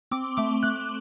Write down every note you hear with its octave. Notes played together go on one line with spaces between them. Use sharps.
C4 D6
A3 D6
A3 F#6